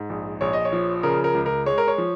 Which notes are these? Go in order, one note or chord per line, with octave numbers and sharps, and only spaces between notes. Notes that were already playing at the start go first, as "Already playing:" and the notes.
Already playing: G#2
A#1
A#1 C#5
D#5
C#5
F3
C#3 A#4
A#4
C#2
A#4
G#3 C#5
A#4
C#5
F3